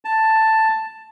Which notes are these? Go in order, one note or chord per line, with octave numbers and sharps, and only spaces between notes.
A5